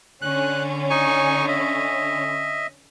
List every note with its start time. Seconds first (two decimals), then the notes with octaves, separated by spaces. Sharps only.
0.22 D3 C#4 F#6
0.90 D#4 G#5 C#6
1.48 D#5 E5